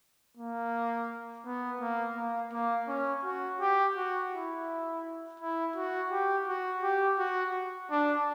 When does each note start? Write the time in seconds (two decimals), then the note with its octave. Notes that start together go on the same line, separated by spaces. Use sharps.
0.37 A#3
1.46 B3
1.81 A#3
2.16 A#3
2.53 A#3
2.88 C#4
3.25 F#4
3.61 G4
3.96 F#4
4.32 E4
5.40 E4
5.76 F#4
6.11 G4
6.48 F#4
6.83 G4
7.19 F#4
7.91 D4